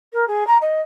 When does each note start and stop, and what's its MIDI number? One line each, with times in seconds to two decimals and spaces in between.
0.13 0.28 70
0.28 0.46 68
0.47 0.57 82
0.61 0.81 75